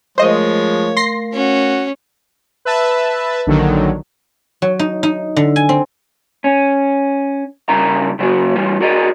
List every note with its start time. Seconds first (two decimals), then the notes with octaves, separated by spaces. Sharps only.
0.18 F3 G#3 A3 A#4 C5 C#5 D#5 F5
0.97 C6 A#6 C7
1.33 C#4 F#4
2.65 B4 E5 A5
3.47 A#1 D3 D#3 F#3
4.62 F#3
4.79 D#4
5.03 D#4
5.36 D3
5.56 G#5
5.69 C4
6.44 C#4
7.69 G2 C#3 E4 A#4 A#5
8.19 C#3 F#3 A#3 F#4
8.56 E3 G3 F4
8.80 F#4 G#4 A#4 D5 D#5